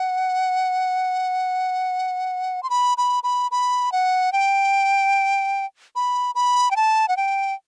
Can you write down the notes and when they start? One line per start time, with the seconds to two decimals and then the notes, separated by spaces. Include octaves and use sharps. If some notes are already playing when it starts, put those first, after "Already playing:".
Already playing: F#5
2.63 C6
2.70 B5
2.98 B5
3.24 B5
3.51 B5
3.92 F#5
4.32 G5
5.96 B5
6.35 B5
6.71 G5
6.76 A5
7.08 F#5
7.17 G5